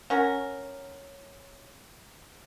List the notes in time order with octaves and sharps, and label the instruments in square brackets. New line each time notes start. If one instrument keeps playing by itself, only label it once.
[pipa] C#4 F#4 A#4